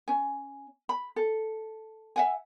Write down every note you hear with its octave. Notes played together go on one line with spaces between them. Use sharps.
C#4 G#5
B5
A4
E5 F#5 G#5